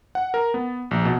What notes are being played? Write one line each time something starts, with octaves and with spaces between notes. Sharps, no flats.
F#5
A#4
B3
A#1
B2